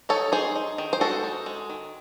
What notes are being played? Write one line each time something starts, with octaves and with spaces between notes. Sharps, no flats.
D#4 A4 C#5
D#4 G#4 C5
D#4
D#3
C5
G#3 F#4 A4
D#4
G#3
D#3